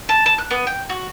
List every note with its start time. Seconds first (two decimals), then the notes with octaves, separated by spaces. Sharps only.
0.09 A5
0.26 A5
0.38 F#6
0.51 B3
0.67 G5
0.89 F#4